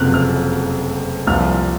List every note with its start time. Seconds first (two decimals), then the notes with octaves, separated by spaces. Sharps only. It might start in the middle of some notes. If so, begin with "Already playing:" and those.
Already playing: F#1 F2 C3 F6 F#6
0.14 F6
1.27 C2 A#2 F3 F6